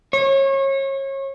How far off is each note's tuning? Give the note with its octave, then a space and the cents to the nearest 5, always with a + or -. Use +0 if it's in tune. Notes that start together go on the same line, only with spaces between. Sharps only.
C#5 -30